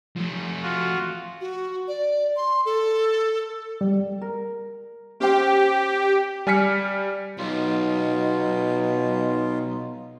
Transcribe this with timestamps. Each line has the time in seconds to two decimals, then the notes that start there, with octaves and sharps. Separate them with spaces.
0.16 F3 A3
0.62 F4 F#4
1.41 F#4
1.88 D5
2.36 C6
2.65 A4
3.81 G3
4.22 A#4
5.20 C#4 G4 C5 G5
6.47 G3 G#5 F6 B6 C#7
7.38 B1 B2 D#4 F4